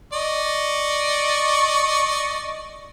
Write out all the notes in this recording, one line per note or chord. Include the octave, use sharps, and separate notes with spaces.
D5 D#5 C#6